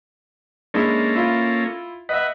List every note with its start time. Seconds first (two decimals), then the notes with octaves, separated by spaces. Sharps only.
0.74 G#3 A#3 C#4 D4 E4 A4
1.15 E4 F4
2.09 B4 D#5 E5 F#5